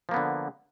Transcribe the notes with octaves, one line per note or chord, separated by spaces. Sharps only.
D3 F3 A#3 B3